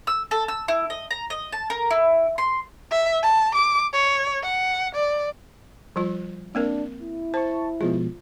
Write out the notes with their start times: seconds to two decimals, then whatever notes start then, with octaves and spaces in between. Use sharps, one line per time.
0.07 E6
0.31 A4
0.48 E6
0.68 E4
0.90 D#5
1.11 A#5
1.30 D#5
1.53 A5
1.70 A#4
1.91 E4
2.38 C6
2.91 E5
3.22 A5
3.55 D6
3.93 C#5
4.43 F#5
4.95 D5
5.96 F3 G3 F4
6.55 A#3 C4 D4 A#4
7.02 E4
7.34 C5 A5 C#6
7.81 B2 F3 G#3 F4